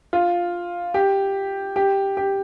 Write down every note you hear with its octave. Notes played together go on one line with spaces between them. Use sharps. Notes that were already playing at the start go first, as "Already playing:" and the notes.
F4
G4
G4
G4